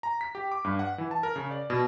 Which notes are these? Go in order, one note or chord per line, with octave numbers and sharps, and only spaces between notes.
A#5
B6
G4
D6
G2
F#5
E3
A5
A#4
C#3
D5
B2